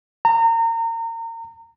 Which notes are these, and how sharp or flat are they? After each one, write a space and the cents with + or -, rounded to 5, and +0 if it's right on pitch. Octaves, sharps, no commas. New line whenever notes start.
A#5 -30